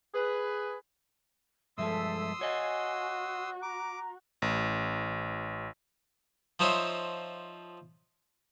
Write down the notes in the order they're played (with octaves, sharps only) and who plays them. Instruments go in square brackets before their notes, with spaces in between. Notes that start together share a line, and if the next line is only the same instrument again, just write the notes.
[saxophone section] G#4 B4
[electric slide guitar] G2 F3 G#3 [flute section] A4 E5 [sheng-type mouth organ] C6 D#6 E6
[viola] F#4 [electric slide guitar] C#5 D#5 F5 [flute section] G#5
[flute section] A#5 [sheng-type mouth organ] D6
[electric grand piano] A1
[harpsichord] F3 D#4 C5 C#5 D#5 E5